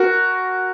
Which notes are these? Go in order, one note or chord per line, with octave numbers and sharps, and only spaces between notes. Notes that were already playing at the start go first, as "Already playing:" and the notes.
Already playing: F#4 A#4